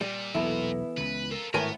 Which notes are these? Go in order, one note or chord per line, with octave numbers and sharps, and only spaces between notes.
A#2 G3
E1 B1 B2 E3 B3 E4 A4
C#2 C#3 B4
F4 A4 A#4
G#1 A2 B3 E4 A#4 B4 C#5 G#5